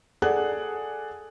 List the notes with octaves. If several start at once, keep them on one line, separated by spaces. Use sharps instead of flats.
G#4 A4 D5 F#5 F#6